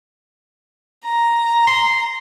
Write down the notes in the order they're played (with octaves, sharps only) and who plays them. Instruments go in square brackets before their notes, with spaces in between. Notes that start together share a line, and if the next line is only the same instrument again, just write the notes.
[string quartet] A#5
[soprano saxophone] C6